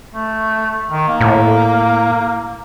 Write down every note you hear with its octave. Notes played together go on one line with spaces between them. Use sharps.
A3
D#3
A#3
A2